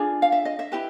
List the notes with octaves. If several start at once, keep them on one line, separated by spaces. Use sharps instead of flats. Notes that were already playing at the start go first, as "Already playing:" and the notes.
Already playing: D4 F4 G#4
F5
E5
D#5
E5
E4 G4 B4